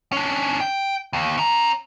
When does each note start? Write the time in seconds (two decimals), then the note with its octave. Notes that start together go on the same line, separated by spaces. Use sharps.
0.12 C#4 D4
0.60 G5
1.13 D#2
1.38 C#4 A#5